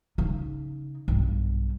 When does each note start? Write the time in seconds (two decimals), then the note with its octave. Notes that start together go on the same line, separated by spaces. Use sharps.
0.18 C#3 D#4
1.08 B1 G2